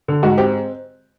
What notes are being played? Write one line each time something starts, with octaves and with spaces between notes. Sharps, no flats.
D3
G#2 F#4
C4 G4